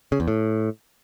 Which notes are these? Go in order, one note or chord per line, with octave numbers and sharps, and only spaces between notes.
C#3
E2
A2